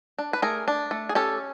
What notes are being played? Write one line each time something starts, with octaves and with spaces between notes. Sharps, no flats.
D4
B4
A3 G#4 A#4
D4
A3
G#4
C#4 G4 A4